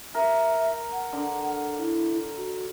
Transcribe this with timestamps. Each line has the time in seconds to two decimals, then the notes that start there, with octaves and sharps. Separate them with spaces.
0.15 A#4 E5
0.92 F#5
1.13 D3
1.78 E4
2.37 F#4